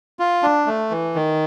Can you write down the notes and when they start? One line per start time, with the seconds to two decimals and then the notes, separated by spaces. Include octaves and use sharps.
0.19 F4
0.43 D4
0.66 A3
0.91 E3
1.15 D#3